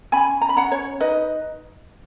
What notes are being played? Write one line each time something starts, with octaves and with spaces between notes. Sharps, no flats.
C#4 G#5 B5
A#5
B5
C#4 F#5 A#5
C#5
D#4 B4 D#5